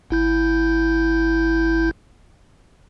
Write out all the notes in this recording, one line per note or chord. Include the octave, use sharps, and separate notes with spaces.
G1 E4 G6